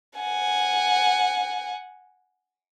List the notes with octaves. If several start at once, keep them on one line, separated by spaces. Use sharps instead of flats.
F#5 G#5